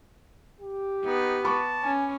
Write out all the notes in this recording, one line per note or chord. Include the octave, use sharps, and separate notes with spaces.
G4
B3 D#4
A5 B5 C#6 D6
C#4 G#5